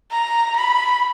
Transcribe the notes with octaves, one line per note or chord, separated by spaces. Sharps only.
A#5
B5